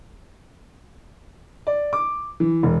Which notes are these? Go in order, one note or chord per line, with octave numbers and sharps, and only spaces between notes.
D5
D6
E3
E1